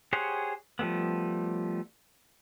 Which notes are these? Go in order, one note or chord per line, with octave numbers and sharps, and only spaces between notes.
G4 G#4 C5 C#5 F#5
F3 G3 A3 B3